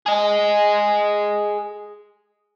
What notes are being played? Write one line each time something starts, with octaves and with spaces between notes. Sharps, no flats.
G#4 D#5